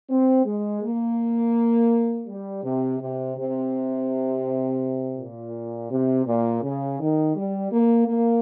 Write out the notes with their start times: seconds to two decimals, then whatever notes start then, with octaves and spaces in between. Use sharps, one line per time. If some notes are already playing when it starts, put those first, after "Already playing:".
0.10 C4
0.46 G#3
0.82 A#3
2.27 G3
2.64 C3
3.01 C3
3.37 C3
5.17 A#2
5.91 C3
6.26 A#2
6.63 C#3
7.00 D#3
7.36 G3
7.72 A#3
8.08 A#3